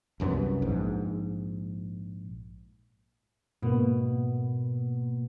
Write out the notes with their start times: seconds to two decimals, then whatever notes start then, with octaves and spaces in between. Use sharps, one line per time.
0.20 C2 F#2 F3 B3
0.62 A#1 G#2
3.62 G#2 B2 A#3 B3